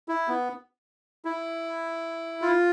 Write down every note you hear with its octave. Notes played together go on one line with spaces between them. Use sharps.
E4
B3
E4
F4